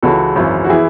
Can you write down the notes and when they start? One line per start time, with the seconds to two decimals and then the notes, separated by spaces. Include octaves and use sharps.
0.02 C#2 C#3 E3 F#4 A4
0.36 G#1 F#2 E3
0.64 F#4
0.70 E3 E4 G#4